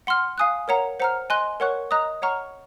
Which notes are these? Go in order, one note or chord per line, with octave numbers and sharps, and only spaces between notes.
F#5 C6 F6
F5 G#5 D#6 F#6
A#4 C#5 F#5 A#5
C5 F#5 A#5 F6
D#5 G#5 C6 F#6
A#4 C#5 F#5 C#6 F#6
D#5 A#5 D#6 F#6
C#5 F#5 A#5 C#6 F6